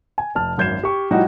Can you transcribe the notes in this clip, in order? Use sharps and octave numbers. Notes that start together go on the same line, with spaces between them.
G#5
F1 A5 F6
G#1 F#2 G6 G#6 C7 E7
G4 C#6
A2 F3 G3 D#4 F#4